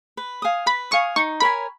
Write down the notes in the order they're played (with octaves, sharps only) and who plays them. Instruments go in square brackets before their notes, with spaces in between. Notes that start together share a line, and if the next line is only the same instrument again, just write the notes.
[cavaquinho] B4
F5 G#5 D#6
[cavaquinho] B4 [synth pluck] B5
[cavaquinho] F5 G#5 D#6 [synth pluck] C#6
[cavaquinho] D#4 [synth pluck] C#6
[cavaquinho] A#4 C#5 G#5 [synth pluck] B5